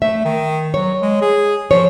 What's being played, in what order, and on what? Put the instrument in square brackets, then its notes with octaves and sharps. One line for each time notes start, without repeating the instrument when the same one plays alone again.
[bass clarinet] A3 [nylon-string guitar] E5
[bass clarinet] D#3
[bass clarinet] F#3 [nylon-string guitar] C#5
[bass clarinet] G#3
G#4
[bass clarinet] F3 [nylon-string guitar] C#5